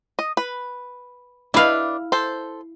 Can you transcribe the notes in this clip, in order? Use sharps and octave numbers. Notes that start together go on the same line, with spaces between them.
D#5
B4
D4 E4 B4 F5
A4 C5